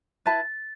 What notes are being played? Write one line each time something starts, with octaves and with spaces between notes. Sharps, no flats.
E4 B4 A5 A6